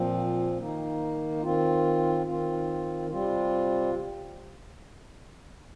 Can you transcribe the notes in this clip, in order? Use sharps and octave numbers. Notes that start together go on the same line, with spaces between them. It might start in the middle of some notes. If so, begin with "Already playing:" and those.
Already playing: A#2 F3 C4
D#3 A#3 D#4
D#3 C4 F4
D#3 C4 F4
C3 G3 C4 F4